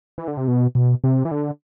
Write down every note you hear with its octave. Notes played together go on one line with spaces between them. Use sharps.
E3
D3
C3
B2
B2
C3
E3
D3